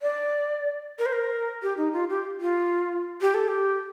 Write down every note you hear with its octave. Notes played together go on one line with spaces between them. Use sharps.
D5
A#4
C5
A#4
G4
D#4
F4
G4
F4
G4
A4
G4